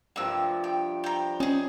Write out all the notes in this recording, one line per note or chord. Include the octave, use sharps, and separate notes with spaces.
G2 C3 F3 A#3 E6
G5
G5 A#5
C#4 D#4 G#4